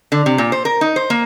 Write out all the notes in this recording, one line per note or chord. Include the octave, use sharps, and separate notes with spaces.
D3
C3
A#2
C5
A#4
D#4
C5
A#3